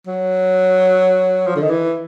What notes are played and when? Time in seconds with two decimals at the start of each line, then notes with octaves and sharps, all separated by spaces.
0.07 F#3
1.47 F3
1.56 D3
1.62 D#3
1.70 E3